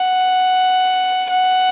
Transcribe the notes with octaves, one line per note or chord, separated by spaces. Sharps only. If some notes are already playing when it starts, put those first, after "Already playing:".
Already playing: F#5
F#5